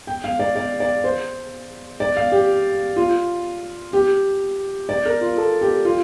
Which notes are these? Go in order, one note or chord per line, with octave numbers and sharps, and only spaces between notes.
G5
F5
D5
D5
D5
C5
D5
F5
G4
F4
G4
D5
A#4
F4
A4
G4
F4